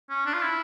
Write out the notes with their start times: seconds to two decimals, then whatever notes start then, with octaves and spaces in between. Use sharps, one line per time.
0.10 C#4
0.26 D4
0.33 F4
0.42 E4